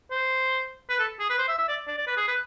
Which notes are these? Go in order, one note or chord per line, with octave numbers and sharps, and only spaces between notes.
C5
B4
A4
G#4
B4
C5
E5
E5
D5
D5
D5
B4
G#4
B4